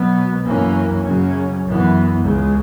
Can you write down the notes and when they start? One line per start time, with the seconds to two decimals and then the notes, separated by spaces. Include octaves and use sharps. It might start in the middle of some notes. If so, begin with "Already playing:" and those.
Already playing: B2 F#3 B3
0.45 F#2 E3 A#3 C#4
1.05 F#2 C#3 F#3 C#4
1.65 F#2 E3 B3
2.24 C#2 C#3 G#3